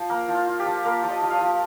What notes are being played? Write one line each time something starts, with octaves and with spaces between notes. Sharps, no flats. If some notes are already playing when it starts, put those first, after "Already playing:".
Already playing: F3 C5
A#3 A#4
F3
F4
F4
G4
F3
A#3 A#4
F3
D#5
F3
D#5 F5
F3